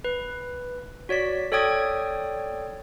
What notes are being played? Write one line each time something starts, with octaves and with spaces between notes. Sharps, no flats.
B4
F#4 C#5 D5 B6
A4 C#5 D5 G5 D#6 G#6